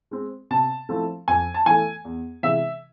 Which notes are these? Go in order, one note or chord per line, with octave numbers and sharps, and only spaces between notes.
G#3 C4
C3 A5
F3 A3 C4 E4
F2 G#5
A5
E3 A3 G#5
E2
C3 E3 G#3 E5